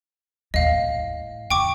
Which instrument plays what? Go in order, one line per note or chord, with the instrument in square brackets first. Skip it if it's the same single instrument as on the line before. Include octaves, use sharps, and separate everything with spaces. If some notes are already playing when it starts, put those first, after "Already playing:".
[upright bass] D#2 A#2 [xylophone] D#5 F5
[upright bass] A2
[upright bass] F2 D3 [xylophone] G5 C#6 D6